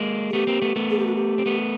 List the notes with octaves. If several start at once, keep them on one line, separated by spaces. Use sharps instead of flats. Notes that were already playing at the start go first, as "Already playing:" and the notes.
Already playing: G#3 A#3
G#4
A3 B3 G4
A#3 C4
A3 B3
A3 B3
G#4
G4
F#4
G4
C4
A3 B3